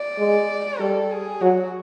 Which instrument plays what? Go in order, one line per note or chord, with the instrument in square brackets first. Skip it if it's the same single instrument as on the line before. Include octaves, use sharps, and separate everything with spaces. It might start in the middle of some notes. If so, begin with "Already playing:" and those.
Already playing: [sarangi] D5
[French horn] G#3
[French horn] G3 [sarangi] A4
[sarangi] G#4
[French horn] F#3 [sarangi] F#4